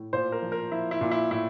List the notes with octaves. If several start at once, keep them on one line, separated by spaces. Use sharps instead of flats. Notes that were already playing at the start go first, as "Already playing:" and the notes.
Already playing: A2
A#2 C5
A#4
F3
A#4
F3 E4
E4
A#2
E4
A2 E4